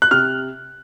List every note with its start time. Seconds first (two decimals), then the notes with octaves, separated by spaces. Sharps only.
0.02 F#6
0.11 C3 F6